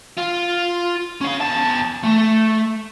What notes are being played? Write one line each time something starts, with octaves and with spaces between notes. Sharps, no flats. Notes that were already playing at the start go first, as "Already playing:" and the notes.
F4
C#4 F5
E2 A5
A3